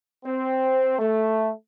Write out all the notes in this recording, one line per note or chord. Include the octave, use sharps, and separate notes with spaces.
C4
A3